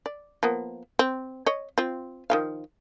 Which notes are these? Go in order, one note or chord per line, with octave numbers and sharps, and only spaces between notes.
D5
F3 A#3 B3
C4
C#5 D#5
C4 F4
D#3 F3 F5